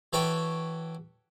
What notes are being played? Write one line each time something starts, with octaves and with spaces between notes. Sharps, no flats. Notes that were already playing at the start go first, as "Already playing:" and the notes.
E3 F#4 A4 B4 C#5 G5